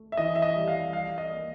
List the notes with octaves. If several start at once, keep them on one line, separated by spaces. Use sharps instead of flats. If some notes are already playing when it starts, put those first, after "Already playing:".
Already playing: A3
E5
E3 D#5
E5
D#5
G3
F5
G3 F5
D#5
A#3